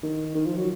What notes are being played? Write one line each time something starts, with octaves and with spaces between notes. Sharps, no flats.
D#3
D#3
F3
F#3